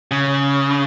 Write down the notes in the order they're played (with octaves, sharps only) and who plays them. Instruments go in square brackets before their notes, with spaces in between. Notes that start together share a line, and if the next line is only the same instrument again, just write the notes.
[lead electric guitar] C#3